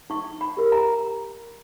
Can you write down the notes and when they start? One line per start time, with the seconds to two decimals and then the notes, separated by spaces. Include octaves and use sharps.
0.10 D#4 C#6
0.41 B5
0.57 G4 A#4
0.72 A#5